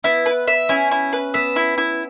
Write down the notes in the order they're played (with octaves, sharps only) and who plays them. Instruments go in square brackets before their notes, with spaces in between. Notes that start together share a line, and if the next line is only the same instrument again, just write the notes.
[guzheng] B3 [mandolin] E4
[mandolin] B4
E5
[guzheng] C#4 [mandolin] E4
[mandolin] E4
B4
[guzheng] B3 [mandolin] E5
[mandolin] E4
E4